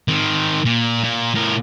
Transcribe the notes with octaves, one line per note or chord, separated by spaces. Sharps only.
D#3 C4
A#2
A#2
A2 A#4